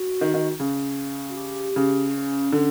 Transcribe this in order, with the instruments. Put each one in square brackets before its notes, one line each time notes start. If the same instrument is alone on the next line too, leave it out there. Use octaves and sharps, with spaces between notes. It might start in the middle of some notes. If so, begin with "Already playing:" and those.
Already playing: [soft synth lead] F#4
[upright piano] D#3
D#3
C#3
[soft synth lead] F#4
G4
[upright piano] C#3
[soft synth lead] C#4
[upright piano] D3